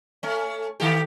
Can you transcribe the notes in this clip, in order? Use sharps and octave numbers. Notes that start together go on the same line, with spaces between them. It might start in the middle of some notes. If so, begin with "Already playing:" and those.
A3 C#4
D#3 A3 G4